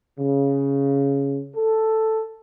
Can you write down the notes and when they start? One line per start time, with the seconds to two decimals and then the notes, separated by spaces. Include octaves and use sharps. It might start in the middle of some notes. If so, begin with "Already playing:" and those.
0.19 C#3
1.55 A4